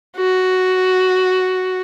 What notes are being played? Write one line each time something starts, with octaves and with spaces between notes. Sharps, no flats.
F#4